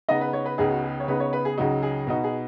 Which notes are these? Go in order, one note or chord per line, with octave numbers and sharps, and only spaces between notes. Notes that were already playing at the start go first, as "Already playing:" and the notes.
C#3 B3 D#4 D#5
B4
C#5
B4
C#2 C#3 B3 D#4 G#4
F#4
G#4
C#5
C#3 B3 D#4 B4
C#5
B4
G#4
C#2 C#3 F#3 D#4 F#4
G#4
B2 B3 D#4 F#4
G#4